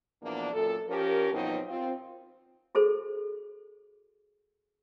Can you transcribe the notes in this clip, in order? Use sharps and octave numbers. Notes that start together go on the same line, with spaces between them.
E2 B2 F3 A#3 D4
F#2 A#2 A4
F3 C#4 G4 A#4
G2 B2 F3 F#3 C4 D#4
C4 F4
F#4 G#4 A4 C5